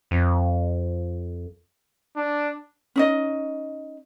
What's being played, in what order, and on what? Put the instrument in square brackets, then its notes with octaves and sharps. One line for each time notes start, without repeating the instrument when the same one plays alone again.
[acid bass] F2
[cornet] D4
[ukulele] C#4 D#4 D#5